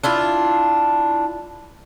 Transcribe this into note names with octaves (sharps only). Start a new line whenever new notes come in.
D4 E4 F4